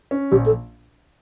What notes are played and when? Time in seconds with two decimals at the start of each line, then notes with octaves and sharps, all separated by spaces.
0.11 C#4
0.31 A#1 G4
0.46 A4